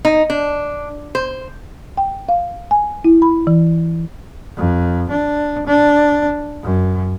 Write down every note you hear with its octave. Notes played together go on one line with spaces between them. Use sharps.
D#4
D4
C5
G5
F5
G#5
E4
B5
E3
F2
D4
D4
F#2